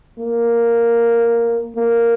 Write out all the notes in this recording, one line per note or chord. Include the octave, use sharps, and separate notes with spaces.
A#3
A#3